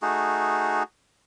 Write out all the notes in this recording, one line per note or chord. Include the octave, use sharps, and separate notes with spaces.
A3 D#4 F#4 G#4